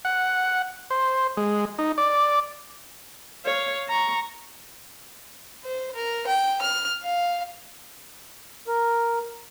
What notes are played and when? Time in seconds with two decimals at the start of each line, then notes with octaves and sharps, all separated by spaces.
0.05 F#5
0.90 C5
1.37 G#3
1.79 D#4
1.98 D5
3.46 C#5 F5
3.89 A#5 C#6
5.64 C5
5.95 A#4
6.27 G5
6.61 F6
7.02 F5
8.67 A#4